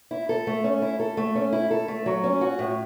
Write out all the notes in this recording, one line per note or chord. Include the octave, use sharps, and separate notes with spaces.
E4
A4
A3
C#4
E4
A4
A3
C#4
E4
A4
A3
F#3
C#4
F#4
A2